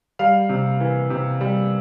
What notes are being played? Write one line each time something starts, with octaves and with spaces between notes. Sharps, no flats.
G3 F5
C3
E3
C3
G3